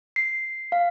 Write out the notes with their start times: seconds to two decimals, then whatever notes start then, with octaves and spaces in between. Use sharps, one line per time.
0.16 C7
0.72 F5